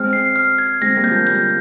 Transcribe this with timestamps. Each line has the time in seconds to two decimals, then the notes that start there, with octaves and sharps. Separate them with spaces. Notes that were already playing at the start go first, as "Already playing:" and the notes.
Already playing: G#3 C4 F6
0.13 C7
0.36 F6
0.58 G#6
0.81 G#3 C4 A#6
0.96 G3 A#3
1.04 G6
1.11 F3 G#3
1.26 G3 G6